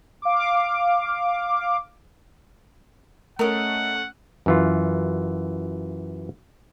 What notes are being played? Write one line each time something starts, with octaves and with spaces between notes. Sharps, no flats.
F5 D6
A3 C#4 A#4 D#5 F#5
F#2 E3 F4